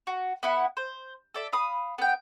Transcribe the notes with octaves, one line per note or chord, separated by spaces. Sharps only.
F#4
B3 E4 F#5
C5
A4 D5 E5
F5 B5 D#6
B3 G5